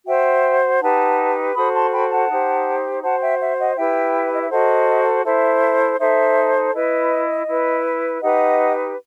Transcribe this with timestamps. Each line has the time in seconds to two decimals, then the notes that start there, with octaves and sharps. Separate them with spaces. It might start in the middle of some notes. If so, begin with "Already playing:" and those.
0.06 F#4 C5 E5 G5
0.81 D#4 G4 B4 F#5 A5
1.55 F#4 A4 C5 B5 D#6
1.73 A5 C6
1.92 G5 B5
2.10 F#5 A5
2.29 D#4 G4 C5
3.02 F#4 C5 F#5 A5
3.21 E5 G5
3.40 E5
3.58 D#5 F#5
3.77 E4 G4 B4 E5 G5
4.31 D#5
4.41 E5
4.50 F#4 A4 C5 D#5 F#5
5.25 E4 A4 C5 E5
5.99 D#4 A4 C5 E5
6.73 E4 B4 D#5
7.47 E4 B4
8.21 D#4 G4 B4 D#5 F#5